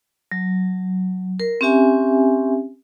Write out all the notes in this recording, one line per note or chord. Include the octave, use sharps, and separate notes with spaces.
F#3
A#4
C4 C#4 G4 E5 G#5